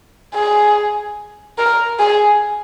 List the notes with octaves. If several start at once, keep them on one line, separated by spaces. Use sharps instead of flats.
G#4
A#4
G#4